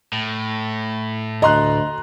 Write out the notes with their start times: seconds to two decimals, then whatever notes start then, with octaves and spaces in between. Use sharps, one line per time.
0.13 A2
1.42 D2 D#5 A#5 C6 F#6